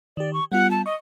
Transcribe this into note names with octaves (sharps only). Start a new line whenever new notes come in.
D#3 G4 D5
C#6
G3 B3 F4 F#5
A5
D#5 C#6